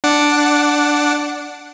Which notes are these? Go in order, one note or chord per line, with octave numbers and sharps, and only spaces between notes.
D4 F#5 D6